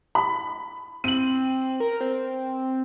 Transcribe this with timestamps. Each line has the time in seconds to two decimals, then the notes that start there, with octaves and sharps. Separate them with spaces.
0.15 B5
1.04 C4 D#7 F#7
1.80 A#4
2.01 C4